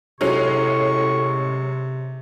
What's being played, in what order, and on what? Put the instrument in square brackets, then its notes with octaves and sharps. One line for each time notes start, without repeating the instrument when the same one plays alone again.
[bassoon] A2 [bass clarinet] C3 [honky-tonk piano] F#3 G#3 C#4 [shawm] C#6